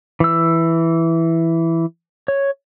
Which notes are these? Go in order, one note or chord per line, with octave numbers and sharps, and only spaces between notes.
E3 E6
C#5